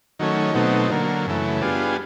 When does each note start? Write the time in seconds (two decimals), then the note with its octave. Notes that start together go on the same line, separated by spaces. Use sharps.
0.19 D#3 F#3 A3 C#4
0.54 B2 F#3 A3 C4 D#4
0.90 D3 F#3 A#3
1.26 F#2 C#3 E3 A3
1.62 G3 B3 D4 F4 G#4